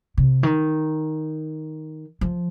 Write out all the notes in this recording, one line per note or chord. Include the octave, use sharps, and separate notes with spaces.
C3
D#3
F3